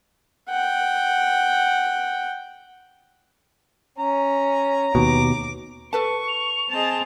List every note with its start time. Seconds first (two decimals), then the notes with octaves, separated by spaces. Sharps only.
0.49 F#5 G5
3.99 C#4 A#5
4.95 D#2 B2 D6
5.93 A4 B4 A5 C#6
6.28 F7
6.70 C4 G#4 D#5 A5